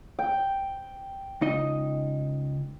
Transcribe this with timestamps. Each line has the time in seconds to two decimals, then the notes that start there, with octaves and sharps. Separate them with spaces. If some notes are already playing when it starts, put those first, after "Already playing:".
0.19 G5
1.41 C#2 D#4 D#5